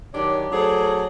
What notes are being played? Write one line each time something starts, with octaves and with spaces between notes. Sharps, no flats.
D#3 F#3 D4 G4 C#5 D5
F#3 A3 D4 G#4 A4 C5